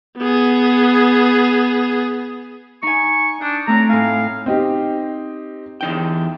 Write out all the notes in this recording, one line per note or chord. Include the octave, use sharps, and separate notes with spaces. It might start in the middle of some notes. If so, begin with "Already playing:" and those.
B3 G#4
D#4 G#5 C#6
D4 D#6 G6
A3 C4 C#5 A#5
A2 F5 G#5
C4 D#4 G4
E2 D#4 G5